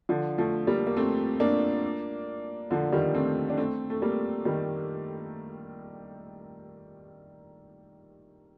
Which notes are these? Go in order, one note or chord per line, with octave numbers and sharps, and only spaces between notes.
D3 F3
F3 A3
G3 A#3
A#3
A3 C4
A#3 D4
D3 F3
D#3 G3
A3 C4
D4
A3 C4
A3
G3 A#3
D#3 G3